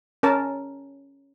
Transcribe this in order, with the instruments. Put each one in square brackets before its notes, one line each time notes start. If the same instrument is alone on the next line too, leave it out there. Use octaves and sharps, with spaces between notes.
[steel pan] C#4 A#4 A5